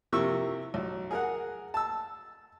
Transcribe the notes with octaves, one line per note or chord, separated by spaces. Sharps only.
C3 F3 A#3 E4 C#6 E6
B1
G#4 A#4 F#5
A5 E6